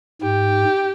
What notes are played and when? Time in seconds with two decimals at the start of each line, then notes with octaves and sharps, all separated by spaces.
0.22 G#2 G4